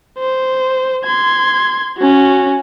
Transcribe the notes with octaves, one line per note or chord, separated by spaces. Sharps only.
C5
C6 G#6
C#4 F#4